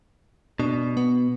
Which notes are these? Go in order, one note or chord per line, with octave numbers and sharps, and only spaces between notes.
B2 D4
B3